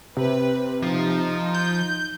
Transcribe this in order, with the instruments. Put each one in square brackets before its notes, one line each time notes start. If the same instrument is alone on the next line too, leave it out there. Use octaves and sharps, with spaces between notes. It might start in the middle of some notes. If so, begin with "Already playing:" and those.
[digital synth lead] C3 [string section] B4
[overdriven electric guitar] F3 [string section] D#4
[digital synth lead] G6